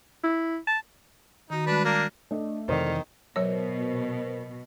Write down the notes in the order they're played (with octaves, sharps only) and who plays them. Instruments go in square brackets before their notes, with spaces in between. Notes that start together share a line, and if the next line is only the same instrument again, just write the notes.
[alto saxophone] E4
A5
[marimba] D#3 F#4 [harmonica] D#4
[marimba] G3 G#3 F#4 [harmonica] D4 B4
[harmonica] A#3 D4
[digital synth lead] A3 [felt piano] D4 D#5
[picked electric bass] F2 C3 E3 [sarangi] D#3 [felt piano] C5 D5
[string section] B2 [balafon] F#3 C#5 [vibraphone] A#4 C5